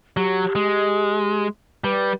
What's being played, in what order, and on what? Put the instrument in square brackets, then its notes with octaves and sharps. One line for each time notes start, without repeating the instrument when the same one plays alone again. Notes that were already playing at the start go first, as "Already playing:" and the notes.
[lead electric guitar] F#3 [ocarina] G4
[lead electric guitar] G#3
[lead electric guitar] G3 [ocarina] B4